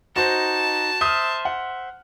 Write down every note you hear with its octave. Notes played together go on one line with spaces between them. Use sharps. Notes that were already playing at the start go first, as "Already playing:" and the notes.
D#4 F#4 C5 A5
C5 E5 D#6 F6
F#5